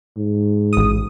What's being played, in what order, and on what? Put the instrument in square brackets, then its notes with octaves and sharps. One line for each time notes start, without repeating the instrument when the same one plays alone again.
[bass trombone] G#2
[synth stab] A1 D#6